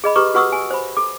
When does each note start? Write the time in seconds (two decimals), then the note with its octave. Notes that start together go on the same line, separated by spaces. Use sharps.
0.04 G#4 D#5 B5
0.16 G4 B4 A#5 C#6 D6
0.34 F#4 B4 F#5 C#6 D#6 E6
0.52 G#5
0.71 C5 B5
0.97 A4 D6